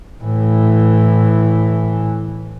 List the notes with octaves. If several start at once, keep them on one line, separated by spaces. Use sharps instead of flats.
A2 E3